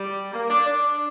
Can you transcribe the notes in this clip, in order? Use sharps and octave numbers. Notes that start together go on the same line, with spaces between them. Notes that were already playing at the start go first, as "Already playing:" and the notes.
Already playing: G3
A#3
D4
D4